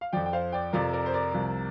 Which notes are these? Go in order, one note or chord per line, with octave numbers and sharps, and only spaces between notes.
F5
F2 F3 D5 G5
G5
C5 F5
D5 G5
F2 C3 F3 A#4 D5
A#4 D5
C5
A#4 D5
C2 C3 F3